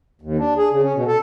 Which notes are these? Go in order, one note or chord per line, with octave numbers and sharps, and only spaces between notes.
D#2
D4
G#4
C#3
C#4
B2
A4